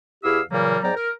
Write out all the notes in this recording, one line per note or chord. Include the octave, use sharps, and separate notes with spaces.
E2 E4 G4 G#4 F5 E6
A#2 C#3 E3 F#3 G3 A#3
G#2 F#3 B3 D5 G5 A#5
A#4